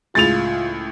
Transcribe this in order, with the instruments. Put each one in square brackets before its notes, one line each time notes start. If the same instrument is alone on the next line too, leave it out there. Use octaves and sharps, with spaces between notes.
[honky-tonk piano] C#2 A2 G#4 [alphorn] F4 [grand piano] A6 F7